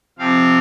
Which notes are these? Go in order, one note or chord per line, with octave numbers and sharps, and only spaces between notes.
C3 F3 C4 F5